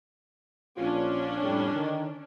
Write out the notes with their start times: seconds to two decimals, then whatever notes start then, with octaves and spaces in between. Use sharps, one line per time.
0.78 A#1 C#4 D4 F4
1.42 F2 A2 G3
1.74 D3 D#3